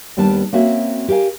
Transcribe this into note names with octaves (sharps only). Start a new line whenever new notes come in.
D#2 G3 B3 D4 A5
A#3 C4 C#4 F#4 E5
G4 A#4 F5 G#5